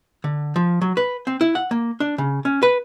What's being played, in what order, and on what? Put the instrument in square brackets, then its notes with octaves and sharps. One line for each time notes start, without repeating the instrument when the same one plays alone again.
[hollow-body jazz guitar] D3
F3
F#3
B4
C4
E4
F#5
A#3
D4
C#3
C#4
B4